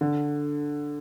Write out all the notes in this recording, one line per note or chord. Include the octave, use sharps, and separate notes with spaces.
D3